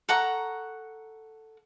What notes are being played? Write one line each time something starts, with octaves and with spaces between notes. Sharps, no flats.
A4 F#5 A#5 C#6